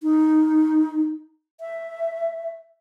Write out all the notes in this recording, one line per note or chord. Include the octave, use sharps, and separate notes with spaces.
D#4
E5